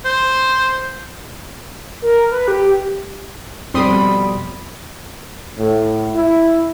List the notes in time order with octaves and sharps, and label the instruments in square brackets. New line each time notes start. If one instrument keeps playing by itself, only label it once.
[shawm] C5
[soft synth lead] A#4
B4
G4
[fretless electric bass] F2 B2 [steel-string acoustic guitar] G3 D5 [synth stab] C4 C6 D#6 [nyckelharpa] B5
[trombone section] A2
E4